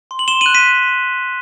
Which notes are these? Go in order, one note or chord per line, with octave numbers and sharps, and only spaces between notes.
C6
F#7
C6 E7 G7
D#7 F#7
F#6
B6 D#7